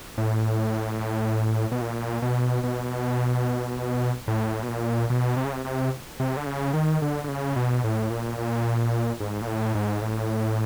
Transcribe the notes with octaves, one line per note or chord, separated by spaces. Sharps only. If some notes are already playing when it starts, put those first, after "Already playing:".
A2
B2
A#2
B2
B2
A2
B2
A#2
B2
C3
C#3
C3
C3
C3
D3
C#3
D#3
D3
D3
C#3
B2
A2
A#2
A#2
G#2
A#2
A2
G#2
A2